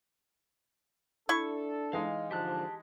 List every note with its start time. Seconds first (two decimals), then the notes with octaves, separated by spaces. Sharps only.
1.29 D4 E4 A4 C#6
1.93 E3 G#3 D#4 F5
2.31 G#2 D3 F3 G4 A5 F#6